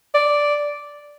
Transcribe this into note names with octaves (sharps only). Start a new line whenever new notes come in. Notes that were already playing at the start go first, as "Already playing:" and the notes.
D5